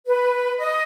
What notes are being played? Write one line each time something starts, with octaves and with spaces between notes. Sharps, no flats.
B4
D#5